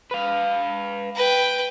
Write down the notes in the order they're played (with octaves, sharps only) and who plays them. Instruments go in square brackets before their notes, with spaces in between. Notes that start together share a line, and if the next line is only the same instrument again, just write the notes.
[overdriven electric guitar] B4 F5
[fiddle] B4 G5